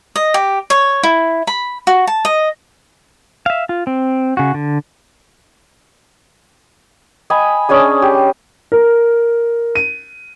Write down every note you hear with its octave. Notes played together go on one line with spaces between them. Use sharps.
D#5
G4
C#5
E4
B5
F#4
A5
D#5
E5 F5
F4
C4
C#3 F#4
D3
D#5 G#5 B5
C#4 D4 G#4 D#5
G4
A#4
D#7